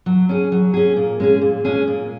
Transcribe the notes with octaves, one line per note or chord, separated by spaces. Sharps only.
F#3
C#4 G#4
F#3
C#4 G#4
A#2
G#3 C#4 G#4
A#2
G#3 C#4 G#4
A#2